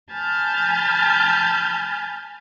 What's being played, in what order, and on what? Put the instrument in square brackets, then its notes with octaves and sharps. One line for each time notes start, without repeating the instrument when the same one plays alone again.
[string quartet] G#5 A5 B5 F6 G6 A6